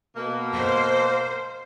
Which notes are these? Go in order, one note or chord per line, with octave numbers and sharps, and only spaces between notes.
B2 A#3
C5